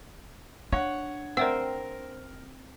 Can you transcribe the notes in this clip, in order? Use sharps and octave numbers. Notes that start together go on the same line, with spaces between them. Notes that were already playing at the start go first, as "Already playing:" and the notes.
D4 C#5 F5 F#5
C4 A#4 D5 E5 F#5 E6